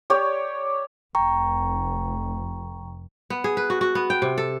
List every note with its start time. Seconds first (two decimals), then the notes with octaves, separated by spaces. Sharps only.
0.10 G4 C#5 D5
1.15 F1 G5 A#5 C#6
3.30 B3
3.44 G#4
3.57 B4
3.70 F#4
3.81 F#4
3.95 B3
4.10 G5
4.22 C3
4.38 A4